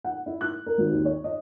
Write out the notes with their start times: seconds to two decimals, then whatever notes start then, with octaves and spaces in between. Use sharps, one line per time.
0.04 F#5
0.26 E4
0.41 F#6
0.66 A#4
0.78 G#1
0.92 D#2
1.05 C#5
1.24 D#5